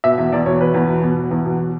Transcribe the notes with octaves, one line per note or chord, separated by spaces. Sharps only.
B2 E5
E2 E5
E2 D5
B2 C#5
E2 B4
E2
B2
B2
E2
E2
B2